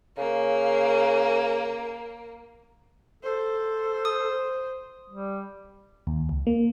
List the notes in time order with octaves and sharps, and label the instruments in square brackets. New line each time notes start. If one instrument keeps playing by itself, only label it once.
[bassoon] C#3 [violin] A#3
[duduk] A4 [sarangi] C5
[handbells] D#6
[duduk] G3
[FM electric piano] D#2
C#2
A#3